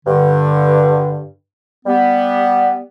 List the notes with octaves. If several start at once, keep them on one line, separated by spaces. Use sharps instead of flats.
G2 D3
G3 B3